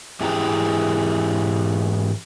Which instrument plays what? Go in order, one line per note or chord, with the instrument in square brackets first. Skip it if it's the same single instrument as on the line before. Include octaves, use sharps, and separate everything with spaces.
[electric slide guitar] G#2 E3 G4 G#4 G5 A#5